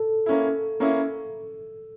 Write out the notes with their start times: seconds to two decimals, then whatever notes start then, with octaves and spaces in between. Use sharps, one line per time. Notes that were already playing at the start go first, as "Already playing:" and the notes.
Already playing: A4
0.26 A#3 C#4 E4
0.80 A#3 C#4 E4